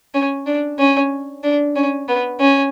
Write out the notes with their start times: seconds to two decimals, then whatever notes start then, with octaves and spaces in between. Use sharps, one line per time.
0.14 C#4
0.46 D4
0.79 C#4
1.44 D4
1.76 C#4
2.08 B3
2.40 C#4